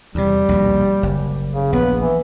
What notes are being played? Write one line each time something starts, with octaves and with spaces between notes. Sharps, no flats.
E2 C3 G3
A#1 D#2 B2
F#1
C#3
A#1 B3
E3